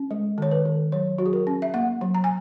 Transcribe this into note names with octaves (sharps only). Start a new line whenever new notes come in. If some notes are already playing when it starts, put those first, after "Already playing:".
Already playing: C#4
G#3
D#3 C#5
B4
D#3
F#3 C#5
F#3 F#4
G#4
A#4
C#4
E5
A#3 F#5
F#3
A#5
G#5